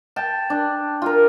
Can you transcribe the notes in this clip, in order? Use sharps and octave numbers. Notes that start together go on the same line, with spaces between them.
G5 A5
D4
F4 A#4